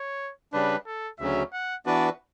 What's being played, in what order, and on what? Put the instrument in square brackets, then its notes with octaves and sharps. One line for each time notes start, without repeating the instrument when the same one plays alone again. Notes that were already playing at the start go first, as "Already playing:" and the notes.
Already playing: [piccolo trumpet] C#5
[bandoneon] C#3 G3 D4 [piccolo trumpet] B4
[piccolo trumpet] A4
[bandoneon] D2 C#3 F#3 C#4 [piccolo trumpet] E5
[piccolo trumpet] F#5
[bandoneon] E3 B3 D4 F#4 B4 [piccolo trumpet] D5